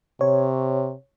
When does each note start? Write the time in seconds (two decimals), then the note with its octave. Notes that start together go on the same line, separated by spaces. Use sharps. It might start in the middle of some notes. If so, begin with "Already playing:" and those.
0.21 C3 C#5